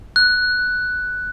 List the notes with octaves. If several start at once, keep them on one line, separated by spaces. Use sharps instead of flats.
F#6